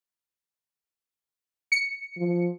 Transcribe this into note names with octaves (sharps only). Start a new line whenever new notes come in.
C#7
F3